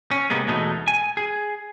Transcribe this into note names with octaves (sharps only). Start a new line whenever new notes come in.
C#4
C3 G#3 A#3 B3
E2 B2 G#3 A3 D#4
G#5
G#4